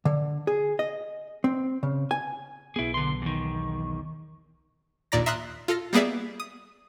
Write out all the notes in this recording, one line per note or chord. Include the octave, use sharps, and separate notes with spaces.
D3
G#4
D#5
C4
C#3
G#5
B1 B3 E4 G#4
D3 C6
E2 D#3
A#1 D#2 A#2 D5 A#5 A#6
E5 A#5 C6 D#6 F6 F#6
F4 A4 F6 A#6
G3 A#3 B3 G#4 D5 E5
D#6